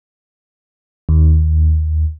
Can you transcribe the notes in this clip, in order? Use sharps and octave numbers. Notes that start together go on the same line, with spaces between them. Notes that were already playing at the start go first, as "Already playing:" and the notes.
D#2